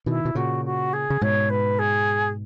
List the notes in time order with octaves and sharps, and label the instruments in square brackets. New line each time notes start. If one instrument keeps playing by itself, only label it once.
[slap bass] B2 D#3 [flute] E4
[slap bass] B2
[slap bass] A#2 C#3 [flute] F#4
[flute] F#4
G#4
[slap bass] C#3
[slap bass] G#2 B2 [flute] C#5
[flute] B4
G#4